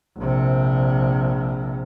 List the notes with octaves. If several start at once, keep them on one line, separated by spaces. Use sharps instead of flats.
A#1 C3